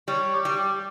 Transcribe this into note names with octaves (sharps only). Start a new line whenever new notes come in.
G3 C#5
G4
G3
G4